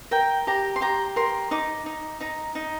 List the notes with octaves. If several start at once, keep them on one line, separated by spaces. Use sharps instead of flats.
A#4 G5
G4 A#5
C6
G4 A#5
A#4 C6
D#4 D6
D#4
D#4 A#5
D#4